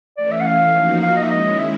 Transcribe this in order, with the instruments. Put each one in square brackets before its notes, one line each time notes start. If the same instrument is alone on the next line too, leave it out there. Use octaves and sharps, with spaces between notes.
[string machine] E3 A3 C#4 [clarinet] D5
[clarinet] E5
F#5
F5
[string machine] F3 A#3 D#4 F#4
[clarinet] F5
D#5
E5
[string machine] D#3 G#3 C#4 E4 [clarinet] D#5
[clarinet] E5